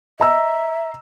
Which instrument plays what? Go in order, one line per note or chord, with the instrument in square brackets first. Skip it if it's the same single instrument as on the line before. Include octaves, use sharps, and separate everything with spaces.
[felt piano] D#5 A#5 E6 [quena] E5